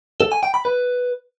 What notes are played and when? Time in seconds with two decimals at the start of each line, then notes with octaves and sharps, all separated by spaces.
0.21 A4
0.32 G#5
0.43 G5
0.54 B5
0.65 B4